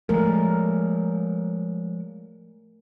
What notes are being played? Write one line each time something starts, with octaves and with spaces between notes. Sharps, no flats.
F3 G#3 A3 A#4